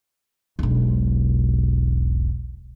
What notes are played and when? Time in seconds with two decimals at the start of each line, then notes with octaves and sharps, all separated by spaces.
0.59 E1 B1